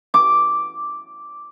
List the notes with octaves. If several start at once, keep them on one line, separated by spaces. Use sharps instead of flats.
D6